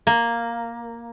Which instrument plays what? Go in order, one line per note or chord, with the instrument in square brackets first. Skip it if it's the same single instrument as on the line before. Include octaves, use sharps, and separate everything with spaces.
[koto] A#3